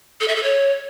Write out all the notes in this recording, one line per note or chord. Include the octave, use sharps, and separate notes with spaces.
A4
E5
A4
C#5